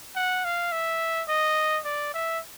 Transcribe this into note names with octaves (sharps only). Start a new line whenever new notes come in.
F#5
F5
E5
D#5
D5
E5